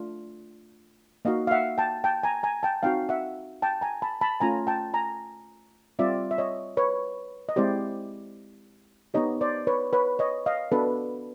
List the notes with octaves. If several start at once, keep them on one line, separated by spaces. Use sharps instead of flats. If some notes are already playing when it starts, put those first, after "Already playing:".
Already playing: A3 D4 F4
A#3 D#4 F#4 D#5 F5
F5
E5 F#5
G5 A5
G5 A5
G#5 A#5
G#5 A#5
G5 A5
C4 D#4 F#4 F5 G5
E5 F#5
G5 A5
G#5 A#5
A5 B5
A5 B5
A3 C#4 F4 G#5 A#5
G5 A5
G#5 A#5
G3 C4 F4 D5 E5
E5
C#5 D#5
B4 C#5
D#5
G#3 C4 E4 G4 C5 D5
B3 D#4 G4 C#5 D#5
C5 D5
B4 C#5
B4 C#5
C#5 D#5
D#5 F5
B3 D4 F#4 A4 B4